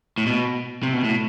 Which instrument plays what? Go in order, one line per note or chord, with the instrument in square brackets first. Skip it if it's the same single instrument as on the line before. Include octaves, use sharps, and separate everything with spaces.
[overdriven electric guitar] A2
B2
C3
B2
A2